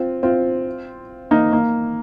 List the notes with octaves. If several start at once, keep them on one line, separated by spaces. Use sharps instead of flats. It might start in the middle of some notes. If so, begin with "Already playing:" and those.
Already playing: C4 F4
C4 F4
A#3 D#4
A#3